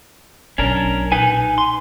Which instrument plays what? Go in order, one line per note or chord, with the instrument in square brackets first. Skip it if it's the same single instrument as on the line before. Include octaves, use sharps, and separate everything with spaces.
[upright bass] B1 [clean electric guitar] C#4 D4 A#4
[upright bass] A#2 [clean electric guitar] D#4 B4 G#5
[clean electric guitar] C6